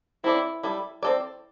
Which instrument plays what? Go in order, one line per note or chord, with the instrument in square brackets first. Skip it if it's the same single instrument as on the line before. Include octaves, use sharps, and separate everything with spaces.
[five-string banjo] C4 A4 D5 [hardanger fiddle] E4
[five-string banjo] G3 E4 A4
C4 A4 D5